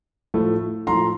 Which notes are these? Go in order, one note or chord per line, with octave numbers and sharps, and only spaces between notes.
A2 F3 A3
A2 F3 A3 A#5 C6